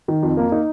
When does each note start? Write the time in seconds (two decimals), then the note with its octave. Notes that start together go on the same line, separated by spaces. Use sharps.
0.08 D#3
0.23 F2
0.37 A#3
0.52 D#4